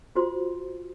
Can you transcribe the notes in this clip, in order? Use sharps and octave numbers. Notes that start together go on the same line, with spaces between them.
F4 F#4 C5 C6